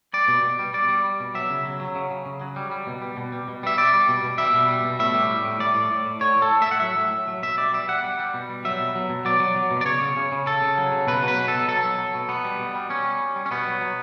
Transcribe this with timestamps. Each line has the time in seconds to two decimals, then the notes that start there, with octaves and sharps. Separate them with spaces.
0.13 G3 D5
0.28 B2
0.43 B2
0.59 G3
0.74 G3 D5
0.89 G3
1.04 G3
1.20 B2
1.35 F#3 E5
1.50 C#3
1.65 F#3
1.81 F#3
1.95 C#3
2.11 C#3
2.26 C#3
2.41 F#3
2.56 G3
2.71 G3
2.87 B2
3.02 G3
3.17 B2
3.32 G3
3.48 B2
3.63 G3 E5
3.78 G3 D5
3.93 G3
4.08 B2
4.23 B2
4.38 G3 E5
4.54 B2
4.69 G3
4.85 B2
4.99 A2 E5
5.14 G3
5.30 G3
5.45 A2
5.60 A2 D5
5.75 A2
5.91 A2
6.05 A2
6.21 A2 C#5
6.37 A2
6.42 A4
6.52 A2
6.62 E5
6.67 A2 F#5
6.80 F#3 E5
6.97 A2
7.12 A2
7.28 F#3
7.42 B2 E5
7.58 G3 D5
7.73 G3 E5
7.88 G3 F#5
8.04 G3
8.19 G3
8.34 B2
8.49 G3
8.65 F#3 E5
8.80 B2
8.95 F#3
9.10 B2
9.25 F#3 D5
9.40 F#3
9.56 F#3
9.71 B2
9.81 D5
9.85 C#3 C#5
10.01 C#3
10.17 C#3
10.32 C#3
10.46 C#3 A4
10.62 C#3
10.77 F#3
10.92 C#3
11.07 B2 B4
11.23 F#3 B4
11.38 B2
11.48 A4
11.54 B2
11.68 F#3 A4
11.84 F#3
11.98 F#3
12.14 B2
12.29 B2 B3
12.45 G3
12.60 B2
12.75 G3
12.90 G3 C#4
13.05 G3
13.20 G3
13.36 G3
13.46 C#4
13.51 B2 B3
13.67 F#3
13.81 F#3